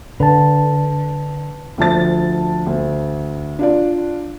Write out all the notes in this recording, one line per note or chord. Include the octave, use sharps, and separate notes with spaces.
D3 B4 A5
D2 F3 A5 A6
D2
D4 F4 D5